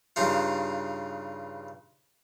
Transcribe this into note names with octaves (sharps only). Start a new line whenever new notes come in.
G2 C#3 D4 D#4 F4